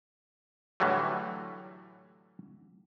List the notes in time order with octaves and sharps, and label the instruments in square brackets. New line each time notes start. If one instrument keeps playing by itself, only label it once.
[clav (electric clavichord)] A2 D3 E3 F#3 G3 A3